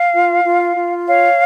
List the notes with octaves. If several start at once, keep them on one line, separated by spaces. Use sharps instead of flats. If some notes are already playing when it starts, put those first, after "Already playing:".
Already playing: F5
F4
F4
F4
C#5 F5